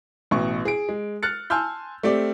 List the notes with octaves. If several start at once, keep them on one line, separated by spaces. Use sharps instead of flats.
A1 B2 C#6
G#4 D7
G#3
F6 F#6 A6 C#7
G#5 A5 C6 E6 F6 G6
A3 C4 G4 D5